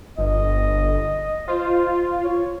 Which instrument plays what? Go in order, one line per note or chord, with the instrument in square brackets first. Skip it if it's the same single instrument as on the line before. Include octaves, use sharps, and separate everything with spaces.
[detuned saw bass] G1 [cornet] D#5
[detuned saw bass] F4 [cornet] C5
[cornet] C#5